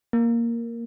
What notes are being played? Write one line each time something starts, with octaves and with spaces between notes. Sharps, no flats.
A#3